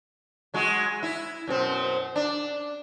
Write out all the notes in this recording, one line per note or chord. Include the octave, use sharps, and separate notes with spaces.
F#3 G#3 F#4
E4
F#2 B2 C4
D4